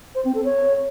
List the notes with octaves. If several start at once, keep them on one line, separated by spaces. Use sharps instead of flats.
C5
C4
A4
C#5